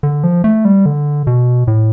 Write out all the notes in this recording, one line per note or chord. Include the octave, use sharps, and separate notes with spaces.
D3
F3
A3
G3
D3
B2
A2